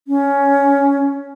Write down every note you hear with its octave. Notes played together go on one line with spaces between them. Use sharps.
C#4